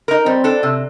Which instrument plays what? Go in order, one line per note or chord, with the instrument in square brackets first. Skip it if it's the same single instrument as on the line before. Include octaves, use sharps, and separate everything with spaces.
[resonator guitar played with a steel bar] D#4 A#4
[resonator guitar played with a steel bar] G3 [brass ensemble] C4
[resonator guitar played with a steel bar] D4 A4
C3